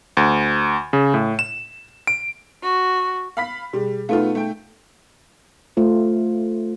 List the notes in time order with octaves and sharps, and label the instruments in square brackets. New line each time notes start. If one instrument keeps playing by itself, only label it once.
[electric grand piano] D2
C#3
A2
E7
D7
[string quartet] F#4
[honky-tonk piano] F5 B5 B6
[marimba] B2 G#4 [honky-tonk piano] G3
[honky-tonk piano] A3 B3 F4 [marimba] D#4 A4 F5
[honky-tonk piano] A3 G5
[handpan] A3 F4 C5